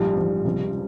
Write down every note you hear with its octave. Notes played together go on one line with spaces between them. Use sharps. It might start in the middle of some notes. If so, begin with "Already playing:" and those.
Already playing: A#1 G#2 F3 G3
A#1 G#2 F3
C#2 C3 F3